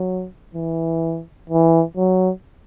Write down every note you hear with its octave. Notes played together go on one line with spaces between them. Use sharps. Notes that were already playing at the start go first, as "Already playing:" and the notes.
Already playing: F#3
E3
E3
F#3